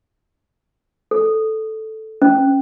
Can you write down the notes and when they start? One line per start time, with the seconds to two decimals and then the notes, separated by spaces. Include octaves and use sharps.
1.11 A4
2.22 C#4